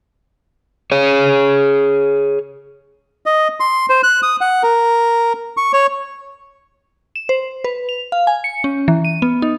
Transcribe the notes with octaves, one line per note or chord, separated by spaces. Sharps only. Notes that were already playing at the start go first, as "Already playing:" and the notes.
G#4 C#5
D#5
C6
C5
F#6
D#6
F#5
A#4
C#6
C#5
E7
C5
B4
F7
F5
G#5
C#7
C#4
E3
D#7
B3
D#4